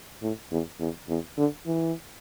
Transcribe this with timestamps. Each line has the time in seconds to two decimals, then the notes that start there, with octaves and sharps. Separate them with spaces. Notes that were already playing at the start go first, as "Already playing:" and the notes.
0.22 A2
0.51 E2
0.80 E2
1.09 E2
1.37 D3
1.66 E3